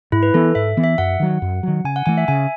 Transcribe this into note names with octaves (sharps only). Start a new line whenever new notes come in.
G#2 E4
B4
E3 B3 A4
G#2 E5
E3 B3
E5
F#2 F#5
D#3 F#3
F#2
D#3 F#3
C#3 G#5
F#5
E3 A3 G#5
E5
C#3 G#5